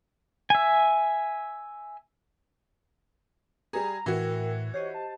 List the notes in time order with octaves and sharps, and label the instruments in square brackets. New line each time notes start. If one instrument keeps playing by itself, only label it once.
[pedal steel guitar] E5 G#5
[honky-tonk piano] G3 G#4 [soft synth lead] A#5
[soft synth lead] A2 [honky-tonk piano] E3 F#4 [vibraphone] A#4 G5 E6
[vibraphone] G4 C5 D#5 [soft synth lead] C#5
[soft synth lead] A5